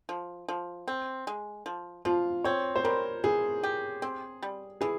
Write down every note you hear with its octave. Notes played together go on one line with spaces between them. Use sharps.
F3
F3
C4
G#3
F3
F3 F4
C4 C#5
C5
G3 A#4
E3 G#4
G4
C4
G3
E3 G#4